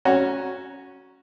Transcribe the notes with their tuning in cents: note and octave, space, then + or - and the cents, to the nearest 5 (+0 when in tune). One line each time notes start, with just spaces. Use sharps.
C#4 -5 F#4 +0 A#5 +5